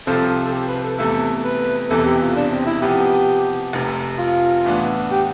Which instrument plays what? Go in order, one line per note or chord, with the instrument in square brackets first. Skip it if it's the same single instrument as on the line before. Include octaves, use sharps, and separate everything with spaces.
[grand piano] C2 C3 F3 C4 F4 [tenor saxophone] A4
[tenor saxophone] A4
G4
B4
A4
[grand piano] E2 C3 E3 A3 E4 [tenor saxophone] A4
[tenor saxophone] B4
[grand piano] E1 E2 C3 E3 [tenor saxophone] A4
[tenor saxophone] G4
F4
D4
C4
E4
[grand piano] C3 F3 B3 [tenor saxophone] G4
[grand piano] F1 F2 C3
[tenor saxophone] F4
[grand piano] A2 E3 B3 D4
[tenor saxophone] G4